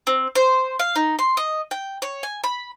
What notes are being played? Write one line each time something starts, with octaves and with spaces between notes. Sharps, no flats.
C4
C5
F5
D#4
C6
D#5
G5
C#5
G#5
B5